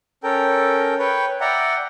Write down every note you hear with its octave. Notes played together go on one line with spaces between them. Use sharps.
C#4 A4 A#4 G5
B4 C#5 G5
D5 E5 F#5 G5 A#5